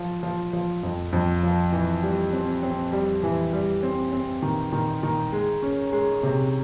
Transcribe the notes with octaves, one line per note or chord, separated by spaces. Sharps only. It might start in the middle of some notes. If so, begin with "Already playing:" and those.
Already playing: F3
F3
F3
F2
F2
F3
E3
G3
C4
C4
G3
E3
G3
C4
C4
D#3
D#3
D#3
G#3
C#4
G#3
C3